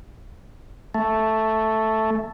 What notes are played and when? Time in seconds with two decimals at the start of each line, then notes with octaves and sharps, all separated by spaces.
0.94 A3